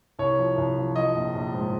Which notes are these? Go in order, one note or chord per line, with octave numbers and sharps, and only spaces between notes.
C2 C#5
F3
C2
F3
F3 D#5
A#1
A#1
G#2